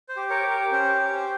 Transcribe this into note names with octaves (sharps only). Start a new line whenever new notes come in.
C5
G4
A#4 C#5
G4
A#4
C#4 C5
G4
C5